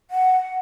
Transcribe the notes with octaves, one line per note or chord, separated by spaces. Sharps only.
F#5